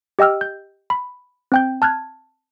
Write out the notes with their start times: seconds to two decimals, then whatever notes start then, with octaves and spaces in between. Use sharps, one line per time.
0.19 G4 D#5 G5 E6 F6
0.41 G6
0.90 B5
1.52 C4 G5 G6
1.82 A5 F6 F#6 G#6